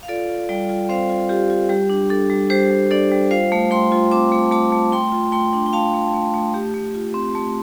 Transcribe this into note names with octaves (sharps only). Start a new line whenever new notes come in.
F5
F4 A4 D5
F4
G3 D5 G5
F4
C4 C5 F5
F4
F4 G4
F4
G3 G4
D4
D4 A4
G3
G3 G4 C5
G3
D4 A4 D5
G3
F4 C5 F5
A3
A3 G5 C6
F4
C4 A5 D6
A3
A3 A5 D6
A3
A3 G5 C6
F4
A3 G5 C6
D4
G5
A3 F5 A5
A3
A3
A3
A3 G4
A3
F4
C4
A3